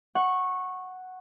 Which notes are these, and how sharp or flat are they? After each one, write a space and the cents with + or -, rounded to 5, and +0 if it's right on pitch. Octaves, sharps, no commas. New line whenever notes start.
F#5 +0 C#6 -15